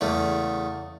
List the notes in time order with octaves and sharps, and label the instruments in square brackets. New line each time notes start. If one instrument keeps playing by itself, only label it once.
[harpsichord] E2 C#3 A3